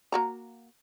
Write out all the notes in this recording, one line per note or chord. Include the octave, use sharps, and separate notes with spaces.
A#3 F#4 A#5